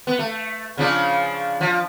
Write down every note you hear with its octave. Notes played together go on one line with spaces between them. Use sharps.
B3
A3
C#3 F3 D4
F3